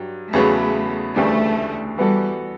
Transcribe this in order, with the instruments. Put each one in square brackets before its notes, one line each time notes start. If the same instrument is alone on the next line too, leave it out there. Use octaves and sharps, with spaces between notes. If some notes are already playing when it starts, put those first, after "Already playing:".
Already playing: [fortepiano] G2 F#3
[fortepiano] E2 C#3 F#3 B3 [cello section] A3
[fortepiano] D2 C#3 E3 G3 D4 [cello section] A3
[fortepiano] E3 B3 F#4 A4 [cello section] G3